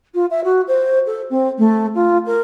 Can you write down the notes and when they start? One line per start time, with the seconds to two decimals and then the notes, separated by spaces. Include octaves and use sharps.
0.14 F4
0.30 E5
0.44 F#4
0.67 C5
1.06 A4
1.30 C4
1.58 A3
1.94 F4
2.26 A#4